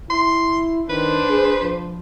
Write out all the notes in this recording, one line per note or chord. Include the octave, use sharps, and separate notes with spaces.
E4 C6
D#3 D4 B4 C5
G#4
F3